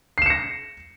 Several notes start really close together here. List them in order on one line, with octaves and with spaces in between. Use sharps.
C7 E7 C#7 A#6